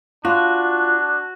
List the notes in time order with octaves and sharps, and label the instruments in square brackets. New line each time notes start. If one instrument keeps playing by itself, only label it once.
[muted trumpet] D4 [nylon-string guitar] F4 [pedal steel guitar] F#4